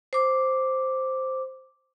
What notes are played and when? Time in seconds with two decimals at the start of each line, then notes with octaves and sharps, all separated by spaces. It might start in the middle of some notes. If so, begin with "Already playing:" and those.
0.13 C5 D6